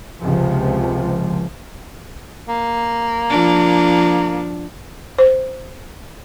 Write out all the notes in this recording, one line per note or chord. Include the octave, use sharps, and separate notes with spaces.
C#2 C3 F3
A#3
F3 D4
C5